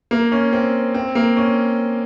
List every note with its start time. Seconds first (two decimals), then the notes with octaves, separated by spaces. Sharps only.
0.11 A#3
0.32 C#4
0.53 C4
0.94 C4
1.15 A#3
1.37 C#4